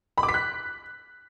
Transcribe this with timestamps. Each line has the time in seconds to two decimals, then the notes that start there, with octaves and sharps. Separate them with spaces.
0.18 B5
0.23 D6
0.29 B6
0.34 F#6